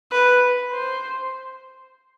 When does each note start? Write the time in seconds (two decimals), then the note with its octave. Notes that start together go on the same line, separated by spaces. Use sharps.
0.12 B4
0.72 C5